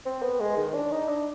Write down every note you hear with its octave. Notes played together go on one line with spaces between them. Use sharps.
C4
B3
G#3
D#3
D4
D#4
D4